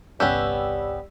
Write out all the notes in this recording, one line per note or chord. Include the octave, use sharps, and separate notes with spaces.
G1 C2 G3 B3 C#4 G4 E6